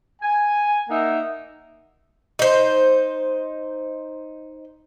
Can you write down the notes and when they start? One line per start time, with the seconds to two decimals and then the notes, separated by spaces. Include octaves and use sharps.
0.22 G#5
0.90 A#3 D#4 A#4 E5 F#5
2.39 D#4 C5